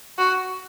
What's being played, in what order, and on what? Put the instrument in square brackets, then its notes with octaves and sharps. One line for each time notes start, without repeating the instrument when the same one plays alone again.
[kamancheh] F#4